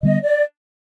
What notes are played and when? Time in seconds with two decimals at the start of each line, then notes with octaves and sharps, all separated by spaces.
0.03 D3 G3 B3 D#5
0.22 D5